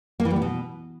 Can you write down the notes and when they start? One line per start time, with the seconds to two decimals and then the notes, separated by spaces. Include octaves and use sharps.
0.20 A#3
0.25 E3
0.31 G3
0.36 B3
0.42 B2